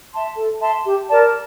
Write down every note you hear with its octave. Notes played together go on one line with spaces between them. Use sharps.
E5 A5 C6
A4
E5 A5 C6
G4
A#4 D5 A5